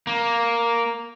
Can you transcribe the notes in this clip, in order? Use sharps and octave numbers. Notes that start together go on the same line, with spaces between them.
A#3